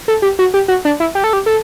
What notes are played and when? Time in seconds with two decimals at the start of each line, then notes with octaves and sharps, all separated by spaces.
0.08 A4
0.22 G4
0.39 F#4
0.54 G4
0.68 F#4
0.85 D4
1.00 E4
1.15 G4
1.24 A4
1.33 G4
1.46 A4